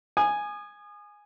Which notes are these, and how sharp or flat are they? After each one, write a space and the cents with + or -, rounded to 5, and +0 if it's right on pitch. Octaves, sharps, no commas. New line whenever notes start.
G#5 +0 D#6 -35